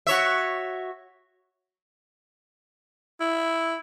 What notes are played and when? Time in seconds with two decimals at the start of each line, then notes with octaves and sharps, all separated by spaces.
0.07 F#4 C#5 E5
3.21 E4